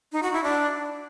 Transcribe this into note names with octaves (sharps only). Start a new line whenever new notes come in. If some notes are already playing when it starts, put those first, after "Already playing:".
D#4
F#4
E4
D4